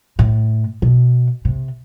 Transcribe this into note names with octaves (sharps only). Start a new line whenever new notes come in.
A2
B2
C3